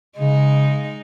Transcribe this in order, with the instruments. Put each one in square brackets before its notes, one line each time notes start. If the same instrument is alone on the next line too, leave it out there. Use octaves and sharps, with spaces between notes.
[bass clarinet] C#3 [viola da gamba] G#3 D#4